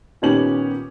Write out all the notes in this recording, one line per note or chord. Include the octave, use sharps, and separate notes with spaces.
A#2 D#3 B3 C#4 G4 F#7